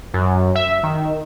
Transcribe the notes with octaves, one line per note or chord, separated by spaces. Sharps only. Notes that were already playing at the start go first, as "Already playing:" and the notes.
F#2
E5
D#3